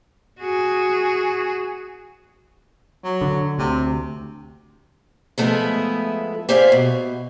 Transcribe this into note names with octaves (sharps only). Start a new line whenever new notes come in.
F#4 G#4
F#3
D3
D2 C3
F3 G#3 A3 B3 E4
G4 G#4 C5 D5 E5 F5
B2